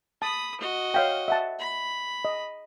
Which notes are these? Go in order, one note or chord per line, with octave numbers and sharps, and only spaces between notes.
A5 B5 D#6
F#4 D#5
C#5 F5 G5
E5 F#5 A5
B5
D#5